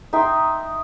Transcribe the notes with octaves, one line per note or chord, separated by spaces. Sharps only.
D#4 E5 G5 C6